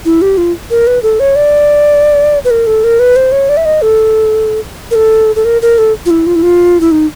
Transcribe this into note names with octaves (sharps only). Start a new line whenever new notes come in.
E4
G4
F4
A#4
B4
A4
C#5
D5
B4
A#4
A4
A#4
B4
C5
C#5
D5
E5
D#5
A4
A#4
A4
A4
A#4
A#4
A4
F4
E4
F4
E4
F4
E4
D#4